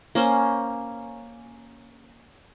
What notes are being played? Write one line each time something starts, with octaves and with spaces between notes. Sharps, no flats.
A#3 C#4 C5